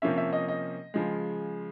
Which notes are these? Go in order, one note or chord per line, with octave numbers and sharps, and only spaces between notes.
C3 F3 A#3 C#4 E5
E5
D#5
D#5
C#3 F3 G#3